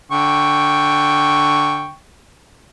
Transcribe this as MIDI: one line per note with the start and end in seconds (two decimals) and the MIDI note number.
0.12 1.93 50
0.12 1.93 79
0.12 1.93 85